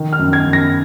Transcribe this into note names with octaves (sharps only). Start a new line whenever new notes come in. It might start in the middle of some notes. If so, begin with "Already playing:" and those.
Already playing: D#3
F6
F#2
G#6
F#2
A#6